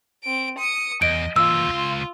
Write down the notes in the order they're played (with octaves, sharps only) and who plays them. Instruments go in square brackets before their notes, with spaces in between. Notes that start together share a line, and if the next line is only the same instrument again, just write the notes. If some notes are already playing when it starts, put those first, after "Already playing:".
[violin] C4 D7
D#6 C#7
[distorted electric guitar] E2 [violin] D#5 [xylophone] D7
[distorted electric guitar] E3 A#3 [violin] F4 [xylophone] E6
[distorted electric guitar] C#2 C6